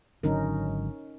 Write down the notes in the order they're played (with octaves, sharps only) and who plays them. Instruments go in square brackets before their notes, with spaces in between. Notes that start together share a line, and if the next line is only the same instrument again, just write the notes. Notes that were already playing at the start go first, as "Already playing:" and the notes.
[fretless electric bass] G#1 D3 F#3 [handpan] C#4 D#4 A#4